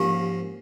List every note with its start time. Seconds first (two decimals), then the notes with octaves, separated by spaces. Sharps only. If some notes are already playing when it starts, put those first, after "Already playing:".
Already playing: G#2 F3 A#3 C#4 G4